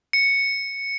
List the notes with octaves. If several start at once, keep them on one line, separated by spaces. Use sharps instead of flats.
C#7